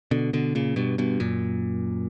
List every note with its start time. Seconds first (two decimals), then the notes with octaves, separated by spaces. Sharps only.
0.11 B2 D3
0.33 B2 D3
0.55 A#2 C#3
0.76 G2 B2
0.98 G2 B2
1.20 F#2 A#2